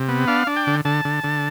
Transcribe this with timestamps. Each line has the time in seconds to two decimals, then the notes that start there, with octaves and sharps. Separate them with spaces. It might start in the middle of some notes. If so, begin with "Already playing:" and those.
Already playing: C3
0.09 B3
0.28 D4 F5
0.47 D4
0.56 G5
0.67 D3
0.85 D3 A5
1.05 D3
1.24 D3